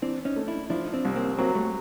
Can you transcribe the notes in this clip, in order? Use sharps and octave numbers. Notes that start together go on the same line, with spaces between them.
E3 C4 D4
C#4 D#4
A3
D4 E4
F3 D4 E4
D#4
C4 D4
C2
A#3 C4
F#3 A#3 C4
G3 A3